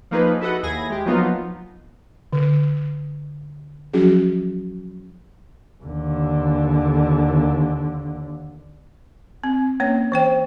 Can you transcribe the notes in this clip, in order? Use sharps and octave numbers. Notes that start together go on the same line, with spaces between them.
F3 A#3 D#4 G#4 B4
E4 F#4 A4 B4 D#5 F#5
D#2 E4 G#4 G#6 A#6
G#3 G4
F3 F#3 A#3 B3 D#4 F4
D3
F3 F#3 C#4 F#4 G#4
D#2 D3
C4
A#3 C#4 C#5
E3 C5 G5